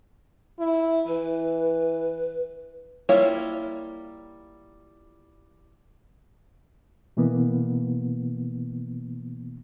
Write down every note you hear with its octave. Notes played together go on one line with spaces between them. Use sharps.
E4
E3 B4
G3 A#3 E4 F4 C#5
B2 E3 A#3 B3